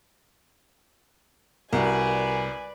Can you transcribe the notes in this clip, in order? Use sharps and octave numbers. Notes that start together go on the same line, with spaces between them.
C2 F#4 A#4 B4 D5 G#5